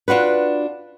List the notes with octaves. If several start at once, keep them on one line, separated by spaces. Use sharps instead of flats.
D4 F4 F#4 B4